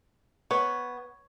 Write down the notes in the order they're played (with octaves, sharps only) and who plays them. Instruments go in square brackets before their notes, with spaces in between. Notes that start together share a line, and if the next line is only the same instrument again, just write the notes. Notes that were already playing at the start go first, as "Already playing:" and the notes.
[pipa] B3 [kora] C#5